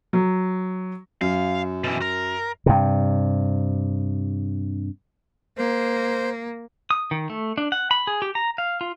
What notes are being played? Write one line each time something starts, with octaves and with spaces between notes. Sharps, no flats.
F#3
F#2 F5
B2 E3
A#4
G2 C3
A#3 C5
D#6
D#3
A3
D4
F#5
B5
G#4
G4
A#5
F5
F4